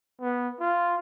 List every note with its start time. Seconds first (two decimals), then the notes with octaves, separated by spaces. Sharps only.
0.21 B3
0.60 F4